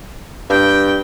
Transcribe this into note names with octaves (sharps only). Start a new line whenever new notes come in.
G2 G5